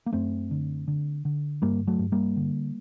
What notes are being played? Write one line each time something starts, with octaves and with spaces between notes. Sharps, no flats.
A#3
F#2 A3 C4
D3
D3
D3
G2 G3 A#3
F#3 A3
G2
G3 A#3
D3